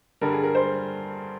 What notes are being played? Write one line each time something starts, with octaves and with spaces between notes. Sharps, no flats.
G2 D3 G3 A#4
G#4
A#4
C5